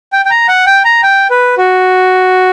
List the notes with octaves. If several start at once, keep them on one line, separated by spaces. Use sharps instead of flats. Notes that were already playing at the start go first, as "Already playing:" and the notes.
G5
G5
A#5
F#5
G5
A#5
G5
B4
F#4